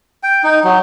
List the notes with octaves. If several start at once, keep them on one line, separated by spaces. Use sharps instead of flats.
G5
D#4
F#3